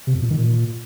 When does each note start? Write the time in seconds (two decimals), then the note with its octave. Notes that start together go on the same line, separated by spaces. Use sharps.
0.07 C3
0.15 F2
0.22 A#2
0.30 D#3
0.38 A#2